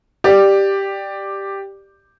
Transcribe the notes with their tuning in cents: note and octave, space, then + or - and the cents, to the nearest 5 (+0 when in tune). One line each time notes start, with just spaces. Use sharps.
G4 +0 D5 +10